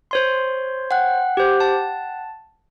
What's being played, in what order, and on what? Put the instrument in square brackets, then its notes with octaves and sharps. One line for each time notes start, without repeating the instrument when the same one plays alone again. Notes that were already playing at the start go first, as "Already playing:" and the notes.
[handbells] C5 C#5 C6
[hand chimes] F#5 G5 F#6
[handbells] G4 C5
A5